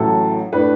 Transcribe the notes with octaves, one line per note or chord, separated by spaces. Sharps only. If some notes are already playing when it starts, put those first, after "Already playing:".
Already playing: A1 A2 F#3 A4
A2 A3 D4 B4